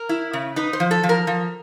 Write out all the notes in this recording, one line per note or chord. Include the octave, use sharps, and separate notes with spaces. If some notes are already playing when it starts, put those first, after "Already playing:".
Already playing: A#4
E4
C#3
D#4 B4
C5
F3
A4
F3
A#4
F3